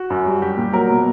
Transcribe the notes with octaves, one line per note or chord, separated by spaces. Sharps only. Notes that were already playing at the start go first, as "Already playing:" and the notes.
Already playing: F#4
F#2
G3
G3 G4
A#2
F#3 A#4
B2